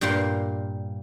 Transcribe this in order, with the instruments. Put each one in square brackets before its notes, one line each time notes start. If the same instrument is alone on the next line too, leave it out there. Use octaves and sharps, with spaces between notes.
[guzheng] G2 A#2 A#3 G4 C6